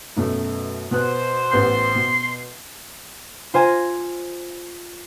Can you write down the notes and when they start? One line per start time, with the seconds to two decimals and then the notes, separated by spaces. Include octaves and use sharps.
0.16 F#2 B2 A3
0.91 B2 B3 C5 F#6
1.52 A1 B3 C6 G6
1.95 B2
3.54 F4 C5 G#5 A#5